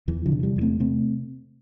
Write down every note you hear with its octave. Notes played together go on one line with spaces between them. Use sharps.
E2 E3
D3 F3
C3
E3 G3
E2
A3 C4
C3 A3 C4